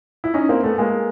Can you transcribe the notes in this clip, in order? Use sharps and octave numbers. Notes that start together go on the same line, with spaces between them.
E4
C#4 D#4
A#3 C4
A3 B3
G#3 A#3